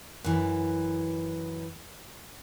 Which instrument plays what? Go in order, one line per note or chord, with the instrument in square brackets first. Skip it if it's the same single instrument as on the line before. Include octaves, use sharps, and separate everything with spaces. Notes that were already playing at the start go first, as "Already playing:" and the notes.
[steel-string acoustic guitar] F#2 E3